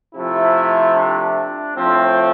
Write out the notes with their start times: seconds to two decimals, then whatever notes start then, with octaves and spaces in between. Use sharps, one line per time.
0.15 C3 F3 A3 E4
0.96 D4
1.76 A2 F3 A3 C4